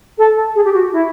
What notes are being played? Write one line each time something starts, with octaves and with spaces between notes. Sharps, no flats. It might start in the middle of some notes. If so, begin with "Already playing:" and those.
A4
G#4
G4
F#4
E4